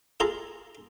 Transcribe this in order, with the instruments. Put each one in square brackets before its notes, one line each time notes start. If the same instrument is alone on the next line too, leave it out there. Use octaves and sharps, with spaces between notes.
[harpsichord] F4 G#4 A4 A#5